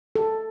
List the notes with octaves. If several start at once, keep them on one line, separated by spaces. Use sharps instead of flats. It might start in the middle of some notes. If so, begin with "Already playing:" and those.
A4